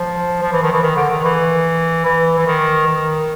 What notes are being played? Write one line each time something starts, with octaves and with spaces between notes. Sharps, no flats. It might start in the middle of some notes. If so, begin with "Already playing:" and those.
Already playing: F3
F3
E3
D#3
E3
D#3
D3
D#3
E3
E3
E3
D#3
D#3